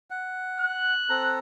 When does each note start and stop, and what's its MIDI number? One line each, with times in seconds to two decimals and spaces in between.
0.10 0.94 78
0.60 1.33 90
1.10 1.39 60
1.10 1.39 69
1.10 1.39 82